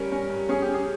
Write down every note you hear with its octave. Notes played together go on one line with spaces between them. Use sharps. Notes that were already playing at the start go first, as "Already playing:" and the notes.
Already playing: G3 C#4 A#4
C#4
G2
C#4 G#4
G4
C#4
G#4